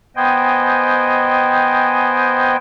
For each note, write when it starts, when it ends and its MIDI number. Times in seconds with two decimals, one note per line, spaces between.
0.16 2.57 59
0.16 2.57 72
0.16 2.57 75
0.16 2.57 79
0.16 2.57 80